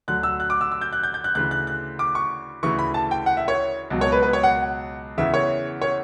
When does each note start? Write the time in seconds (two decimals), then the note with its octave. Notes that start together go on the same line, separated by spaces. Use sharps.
0.08 D2 D3 F#3 F#6
0.23 E6
0.40 F#6
0.50 D6
0.61 E6
0.72 E6
0.81 G6
0.93 F#6
1.03 G6
1.14 G6
1.24 F#6
1.35 D2 C#3 E3 F#6
1.51 F#6
1.67 F#6
1.99 D6
2.15 C#6
2.63 D2 C#3 E3 C#6
2.79 B5
2.94 A5
3.11 G5
3.26 F#5
3.37 E5
3.48 C#5
3.90 C#2 B2 F#3
4.01 C#5
4.12 B4
4.23 B4
4.33 C#5
4.43 F#5
5.18 E2 C#3 E3 E5
5.34 C#5
5.82 C#5